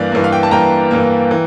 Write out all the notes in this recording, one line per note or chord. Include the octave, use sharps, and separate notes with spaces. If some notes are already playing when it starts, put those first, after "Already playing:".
Already playing: G2 E3 A#3 D5 F5
G2 E3 A#3
F5
G5
A5
G2 E3 A#3 G5 A#5
G2 E3 A#3
E3